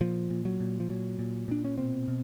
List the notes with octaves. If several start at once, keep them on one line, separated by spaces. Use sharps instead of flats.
A#2 F3
A#2
F#3
A#2
F3
A#2 F#3
A#2
A#2 D4
C#4
B2 C4
B2